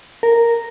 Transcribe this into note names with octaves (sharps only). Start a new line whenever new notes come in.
A#4